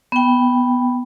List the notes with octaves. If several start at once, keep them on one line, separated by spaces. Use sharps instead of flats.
B3 G5